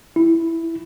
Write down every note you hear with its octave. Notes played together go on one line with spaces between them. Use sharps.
E4